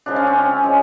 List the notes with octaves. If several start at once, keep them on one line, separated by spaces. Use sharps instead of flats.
C#3 F3 G#3 D4
C#4
C4
C#4
C#3 F3 G#3